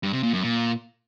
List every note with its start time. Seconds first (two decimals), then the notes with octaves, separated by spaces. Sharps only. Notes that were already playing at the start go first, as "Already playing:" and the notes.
0.03 G2
0.13 C3
0.23 A#2
0.33 F#2
0.44 A#2